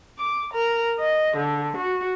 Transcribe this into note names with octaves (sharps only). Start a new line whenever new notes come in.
D6
A#4
D#5
D3
F#4